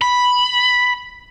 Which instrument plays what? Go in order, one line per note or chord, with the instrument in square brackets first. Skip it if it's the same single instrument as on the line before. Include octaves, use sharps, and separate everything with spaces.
[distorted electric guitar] B5